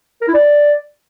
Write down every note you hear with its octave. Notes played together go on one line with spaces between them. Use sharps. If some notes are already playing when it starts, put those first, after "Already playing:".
A#4
E4
D5